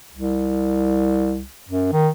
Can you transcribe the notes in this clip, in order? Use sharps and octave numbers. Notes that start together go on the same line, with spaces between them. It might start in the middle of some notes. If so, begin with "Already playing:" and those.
C2
F#2
D#3